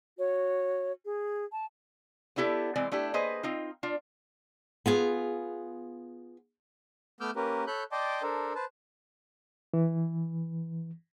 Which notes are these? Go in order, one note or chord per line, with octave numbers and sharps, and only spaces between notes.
F#4 C#5
G#4
A5
B3 D4 E4 G4 A4
E3 G#3 C4 D5
A3 D4 E4 G4
A#3 G#4 B4 C5 D#5
C4 D#4 F4
D4 F4
B3 F4 G#4
A3 B3 D6 E6 F6 G6
A#3 C#4 G4 A#4 B4
A4 C#5 B5 F#6 G6
D5 D#5 G5 A5 C6 D6
D4 A4 A#4 C5
B4 C5 A5
E3